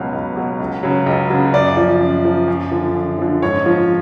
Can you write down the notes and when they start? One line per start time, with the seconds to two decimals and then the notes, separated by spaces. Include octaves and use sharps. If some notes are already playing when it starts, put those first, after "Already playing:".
Already playing: C#2 B2 F#3 F5
0.13 C#2
0.36 B2 F#3
0.60 C#2
0.83 C#3 F#3
1.06 C#2
1.30 C#3 F#3
1.54 F#2 D5
1.77 F3
2.01 F#2
2.25 F3
2.48 F#2
2.71 D3 F3
2.95 F#2
3.19 D3 F3
3.42 G#2 C#5
3.66 F3